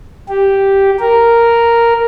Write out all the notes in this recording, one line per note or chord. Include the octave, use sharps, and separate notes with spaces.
G4
A#4